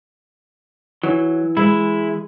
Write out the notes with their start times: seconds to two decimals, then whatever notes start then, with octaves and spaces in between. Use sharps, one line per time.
1.03 E3 F#3
1.57 G#3 E4